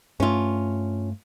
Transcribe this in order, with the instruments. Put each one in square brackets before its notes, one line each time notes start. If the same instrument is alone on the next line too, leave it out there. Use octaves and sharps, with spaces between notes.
[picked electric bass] G2 A3 [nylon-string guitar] C#4 F4